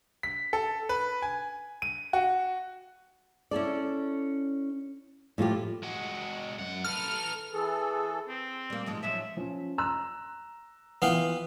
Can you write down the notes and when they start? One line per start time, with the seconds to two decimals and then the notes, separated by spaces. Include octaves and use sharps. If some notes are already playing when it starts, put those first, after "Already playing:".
0.23 B6
0.53 A4
0.89 B4
1.22 G#5
1.82 D#7
2.13 F#4
3.51 C#4 E4 A4 D5
5.38 A2 F3 F4 G4
5.83 G#3 F#4
6.59 F#2 F#5
6.84 A4 B4 F6
7.52 E3 G#4 A4
8.28 C4
8.70 G3 A#3
8.86 G#2 F3 G#3
9.03 F3 F#3 C#4 E5
9.37 F3 C#4
9.78 A#5 E6 F#6
11.02 E3 B3 F4 F5 G5